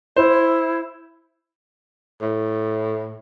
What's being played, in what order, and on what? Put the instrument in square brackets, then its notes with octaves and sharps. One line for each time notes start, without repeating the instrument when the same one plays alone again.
[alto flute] E4 [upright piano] C5
[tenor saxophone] A2